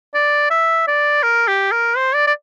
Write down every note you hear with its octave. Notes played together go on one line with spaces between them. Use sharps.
D5
E5
D5
A#4
G4
A#4
C5
D5
D5